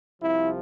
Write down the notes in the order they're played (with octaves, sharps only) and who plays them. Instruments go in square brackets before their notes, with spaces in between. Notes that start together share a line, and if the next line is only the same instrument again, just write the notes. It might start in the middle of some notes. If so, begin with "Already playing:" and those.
[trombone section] C2 C3 F3 E4